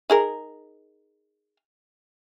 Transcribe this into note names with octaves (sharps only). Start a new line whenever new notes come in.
D#4 G#4 A#4